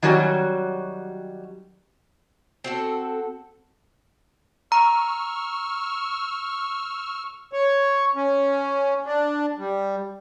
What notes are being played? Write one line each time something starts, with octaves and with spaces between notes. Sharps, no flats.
D#3 F#3 G3 C#4 F#4
C4 F#4 A4
A#5 C#6 E6 F6
C#5
C#4
D4
G3